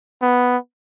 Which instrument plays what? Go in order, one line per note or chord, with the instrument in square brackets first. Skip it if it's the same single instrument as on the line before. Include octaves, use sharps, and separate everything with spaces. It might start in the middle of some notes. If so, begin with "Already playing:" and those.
[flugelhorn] B3